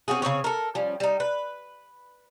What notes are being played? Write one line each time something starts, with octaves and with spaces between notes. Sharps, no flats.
C4 C#4 F#4 G#4
C#3 C4 G#4 C#5
A4 A#4
F3 G3 C#4
G3 D#4
B4